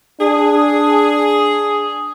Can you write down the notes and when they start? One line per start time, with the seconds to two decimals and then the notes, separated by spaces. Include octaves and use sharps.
0.21 D4 G#4